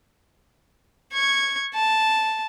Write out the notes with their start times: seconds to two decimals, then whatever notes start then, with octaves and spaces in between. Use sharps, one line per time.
1.14 C#6 G#6
1.74 A5